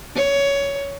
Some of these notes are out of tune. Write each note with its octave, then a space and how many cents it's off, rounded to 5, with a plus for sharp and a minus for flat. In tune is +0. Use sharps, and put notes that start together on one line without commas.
C#5 +15